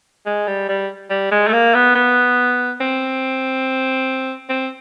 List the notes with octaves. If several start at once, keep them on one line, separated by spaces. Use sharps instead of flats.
G#3
G3
G3
G3
G#3
A3
A#3
B3
B3
C4
C4